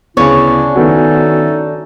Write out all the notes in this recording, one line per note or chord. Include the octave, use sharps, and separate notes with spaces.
D2 C#3 B3 C#4 D4 E4 C#5
D#3 A3 B3 D#4 F#4 A4